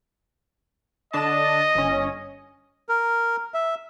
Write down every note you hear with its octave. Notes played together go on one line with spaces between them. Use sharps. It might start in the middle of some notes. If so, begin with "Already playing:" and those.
D3 D4 D#5 A5
G1 C#4
A#4
E5